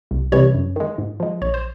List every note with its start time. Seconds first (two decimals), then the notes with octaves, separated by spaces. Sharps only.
0.11 C2
0.32 C3 E3 G3 C#5
0.54 F#2
0.76 D#3 G#3
0.98 G#2
1.20 F3 G#3
1.42 A#1 C#5
1.54 C5